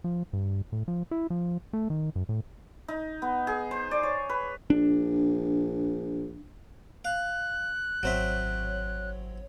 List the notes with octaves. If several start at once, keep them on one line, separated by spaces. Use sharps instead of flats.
F3
G2
A2
F3
E4
F3
A3
D#3
F#2
A2
D#4
B3
G#4
C5
D5
C#5
B4
A#1 D4
F5 F#6
G#1 F#3 C4 C#5 E5